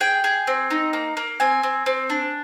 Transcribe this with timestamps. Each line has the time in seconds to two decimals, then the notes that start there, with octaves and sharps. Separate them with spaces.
0.01 G#4 G5
0.24 G#4
0.47 C4
0.70 D#4
0.93 A#3
1.17 A#3
1.40 C4 G#5
1.63 C4
1.86 C4
2.10 D4